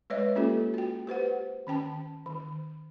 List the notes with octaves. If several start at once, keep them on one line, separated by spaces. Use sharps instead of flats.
G#3 B4 C#5 D#5 E5
A#3 C#4 F4 G4 A4
F#4 G5
G4 B4 C5 F#5
D#3 C#4 G5 A5
D#3